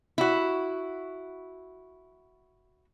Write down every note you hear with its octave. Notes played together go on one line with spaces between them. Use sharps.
E4 F#4